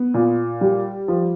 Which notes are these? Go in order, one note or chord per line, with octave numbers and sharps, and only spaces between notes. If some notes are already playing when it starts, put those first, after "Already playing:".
Already playing: B3
A#2
G3
F3